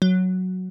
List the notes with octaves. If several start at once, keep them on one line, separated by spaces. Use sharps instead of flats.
F#3